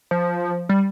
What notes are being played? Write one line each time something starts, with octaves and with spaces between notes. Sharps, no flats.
F3
G3